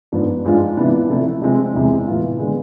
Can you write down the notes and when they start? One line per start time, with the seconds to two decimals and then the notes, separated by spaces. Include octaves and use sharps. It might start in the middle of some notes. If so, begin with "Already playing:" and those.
0.12 G#2 F3 B3 D4
0.44 G#2 F3 G#3 D4 F4
0.77 C3 E3 B3 D4
1.09 C3 F3 A3 E4
1.42 C3 F3 G#3 C4
1.74 E2 C3 G#3
2.07 A2 E3 B3 F4
2.39 D3 G#3 B3